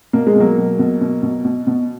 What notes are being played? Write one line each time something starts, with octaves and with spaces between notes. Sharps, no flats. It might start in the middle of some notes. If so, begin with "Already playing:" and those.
B2 A#3
G#3
B2 F#3 A#3
B2
B2
B2
B2
B2
B2